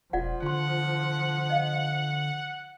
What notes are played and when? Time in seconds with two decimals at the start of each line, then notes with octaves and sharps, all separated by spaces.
0.13 E1 F3 F4 D5 F#5
0.42 D3 F4 F#5 C6
1.50 D#5 F5